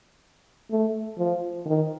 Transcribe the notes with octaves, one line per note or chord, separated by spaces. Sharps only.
A3
F3
D#3